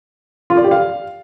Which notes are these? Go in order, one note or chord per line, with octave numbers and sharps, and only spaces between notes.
F4
D5
G4
F5